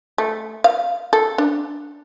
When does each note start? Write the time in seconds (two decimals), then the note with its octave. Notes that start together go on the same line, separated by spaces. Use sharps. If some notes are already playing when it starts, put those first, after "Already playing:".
0.18 A3
0.64 F5
1.13 A4
1.38 D4